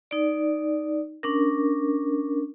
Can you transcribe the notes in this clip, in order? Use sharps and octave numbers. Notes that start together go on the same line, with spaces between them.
D#4 D5
C#4 D4 A#4